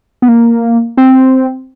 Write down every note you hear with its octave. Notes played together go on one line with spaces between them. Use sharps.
B3
A#3
C4